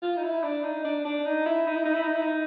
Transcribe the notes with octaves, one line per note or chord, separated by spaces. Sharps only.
F4
D#4
E4
D4
D#4
D4
D4
D#4
E4
D#4
E4
D#4
E4
D#4
E4
D#4